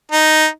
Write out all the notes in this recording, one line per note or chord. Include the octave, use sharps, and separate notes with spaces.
D#4